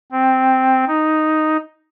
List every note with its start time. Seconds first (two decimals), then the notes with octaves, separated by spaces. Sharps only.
0.12 C4
0.88 D#4